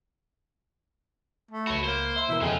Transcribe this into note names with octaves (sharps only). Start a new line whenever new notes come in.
A3
C#2 F#4 C#5 B5
A#3 C5
E5 C6
B2 E3 E4 A#4
F2 C#3 G#3 F4 A4 G5